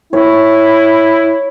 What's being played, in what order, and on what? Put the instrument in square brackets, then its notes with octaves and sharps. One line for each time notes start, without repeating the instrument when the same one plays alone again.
[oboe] E4 [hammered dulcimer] C#5